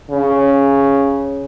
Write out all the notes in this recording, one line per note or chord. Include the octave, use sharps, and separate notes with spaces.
C#3